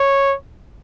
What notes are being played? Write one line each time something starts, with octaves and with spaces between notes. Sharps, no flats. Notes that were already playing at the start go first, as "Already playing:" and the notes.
Already playing: C#5